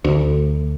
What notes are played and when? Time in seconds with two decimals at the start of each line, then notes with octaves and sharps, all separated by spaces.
0.04 D2